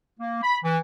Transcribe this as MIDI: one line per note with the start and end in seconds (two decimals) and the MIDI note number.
0.20 0.42 58
0.43 0.58 83
0.65 0.78 52